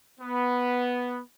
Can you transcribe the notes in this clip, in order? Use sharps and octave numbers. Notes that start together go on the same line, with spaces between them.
B3